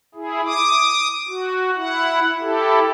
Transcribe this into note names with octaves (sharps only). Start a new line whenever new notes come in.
E4 G#4
D6 D#6
F#4
E4 F#5
E4 G4 A4